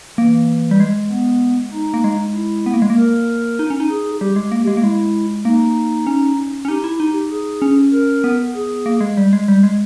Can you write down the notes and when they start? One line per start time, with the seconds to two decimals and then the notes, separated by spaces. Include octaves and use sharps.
0.18 E3 A#3
0.71 G3
0.80 G#3
1.10 B3
1.73 D#4
1.94 A#3
2.04 G#3
2.35 E4
2.66 B3
2.74 A#3
2.82 G#3
2.90 A#3
2.97 A#4
3.59 D#4
3.70 C#4
3.80 D#4
3.89 G#4
4.21 G3 G4
4.36 G#3
4.52 A#3
4.67 G#3
4.77 A#3
4.83 G#3 E4
5.45 A#3 D#4
6.07 C#4
6.65 C#4
6.68 D#4 G4
6.84 E4
7.00 D#4
7.31 G#4
7.62 C#4
7.93 A#4
8.24 B3
8.55 G#4
8.86 A#3
9.01 G#3
9.17 G3
9.33 G#3
9.48 G3
9.63 G#3